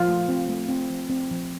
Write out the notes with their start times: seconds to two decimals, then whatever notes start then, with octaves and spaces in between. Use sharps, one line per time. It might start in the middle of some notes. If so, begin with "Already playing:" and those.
Already playing: F3 F4
0.08 A3
0.29 C4
0.49 A3
0.69 C4
0.90 F3
1.10 C4
1.31 F3